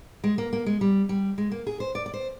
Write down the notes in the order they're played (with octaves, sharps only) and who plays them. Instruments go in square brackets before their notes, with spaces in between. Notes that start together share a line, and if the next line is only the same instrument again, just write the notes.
[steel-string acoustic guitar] G#3
A#3
A#3
G#3
G3
G3
G#3
A#3
G#4
C5
D5
D5
C5